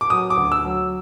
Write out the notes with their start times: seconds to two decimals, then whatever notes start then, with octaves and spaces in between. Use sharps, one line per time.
0.01 D6
0.10 F#3 D#6
0.30 D6
0.37 D2
0.52 E6
0.65 F#3